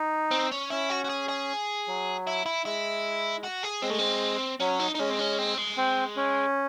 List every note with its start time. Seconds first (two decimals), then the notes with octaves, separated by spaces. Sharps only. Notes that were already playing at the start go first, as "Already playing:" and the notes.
Already playing: D#4
0.31 C4
0.51 C#4
0.70 C#4 E4
0.90 F#4
1.04 F#4
1.09 G#4
1.29 G#4
1.88 F#3
2.27 E4
2.46 E4
2.65 G#3 E4
3.43 F#4
3.63 G#4
3.82 G#3 C4
3.90 A3
3.99 C4
4.60 F#3 C#4
4.80 D#4
4.95 D#4
4.99 G#3 C#4
5.10 C4
5.19 C#4
5.38 C4
5.58 G#3
5.77 C4
6.16 C#4